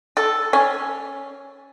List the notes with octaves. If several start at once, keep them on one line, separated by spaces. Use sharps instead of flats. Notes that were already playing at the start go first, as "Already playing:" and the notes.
A4
C#4